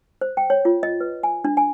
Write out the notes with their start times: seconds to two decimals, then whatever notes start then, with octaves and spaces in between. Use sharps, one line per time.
0.21 C5
0.37 G5
0.50 C#5
0.65 F4
0.83 D#5
1.00 B4
1.23 G#5
1.45 D4
1.57 G#5